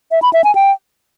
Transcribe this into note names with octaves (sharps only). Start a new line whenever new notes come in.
E5
B5
E5
G#5
G5